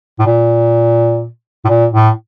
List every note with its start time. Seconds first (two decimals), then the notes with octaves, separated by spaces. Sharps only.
0.19 A2
0.26 A#2
1.65 A2
1.69 A#2
1.93 A2